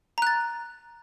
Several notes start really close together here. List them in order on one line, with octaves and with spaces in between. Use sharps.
A#5 F#6 A6